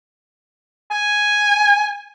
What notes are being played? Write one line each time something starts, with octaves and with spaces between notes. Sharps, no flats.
G#5